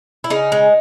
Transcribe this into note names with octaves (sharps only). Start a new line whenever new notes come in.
E4
C#3 D#4
G#3